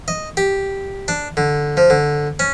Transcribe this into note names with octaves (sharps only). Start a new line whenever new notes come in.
D#5
G4
D4
D3
F3
D3
C#4